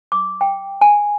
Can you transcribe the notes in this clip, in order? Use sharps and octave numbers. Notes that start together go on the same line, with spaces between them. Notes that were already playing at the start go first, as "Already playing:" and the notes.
D6
G5
G#5